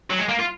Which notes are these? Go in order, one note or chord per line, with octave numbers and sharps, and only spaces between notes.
F#3
G#3
A#3
F4